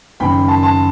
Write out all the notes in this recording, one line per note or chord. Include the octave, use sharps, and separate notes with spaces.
F#1 F#2 D#3 G5 B5
A5 C6
A5 C6